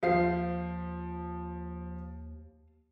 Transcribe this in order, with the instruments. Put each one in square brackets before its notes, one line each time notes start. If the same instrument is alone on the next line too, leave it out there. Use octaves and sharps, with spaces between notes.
[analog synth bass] D#2 [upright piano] F3 C7 [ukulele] C5 F5